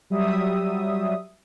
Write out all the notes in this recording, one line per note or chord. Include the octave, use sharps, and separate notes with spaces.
F#3 G3 E5 D#6